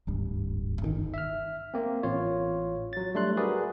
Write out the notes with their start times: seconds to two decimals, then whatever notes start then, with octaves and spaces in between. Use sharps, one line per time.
0.07 D1 G#1 G2
0.81 G1 C3 D#3
1.14 E5 F6
1.74 A#3 C4
2.03 A1 F4 C#5
2.93 F#3 A6
3.15 G3 A3 D4 C6 F#6
3.37 F#4 G#4 A#4 B4 D5